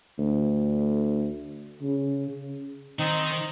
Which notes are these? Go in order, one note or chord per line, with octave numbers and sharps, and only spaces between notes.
D2
C#3
D#3 C4 D#4